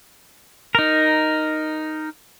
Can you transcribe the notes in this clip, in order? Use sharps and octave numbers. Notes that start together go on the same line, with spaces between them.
D#4 A#4